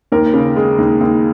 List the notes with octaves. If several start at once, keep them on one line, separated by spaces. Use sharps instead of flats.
D#2 A#4
C#3
G#3
D#2
D#2